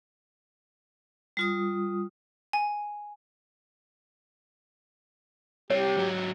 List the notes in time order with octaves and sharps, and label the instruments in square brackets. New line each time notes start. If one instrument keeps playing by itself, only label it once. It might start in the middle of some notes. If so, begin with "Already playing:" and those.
[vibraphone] G3 F4 D#6
[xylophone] G#5
[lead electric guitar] G3 C4 [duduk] G4 [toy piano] C#5
[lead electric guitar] G#2 F#3